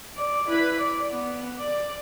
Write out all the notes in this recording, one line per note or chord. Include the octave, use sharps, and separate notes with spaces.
D5
E4 B4
D5
B3
D5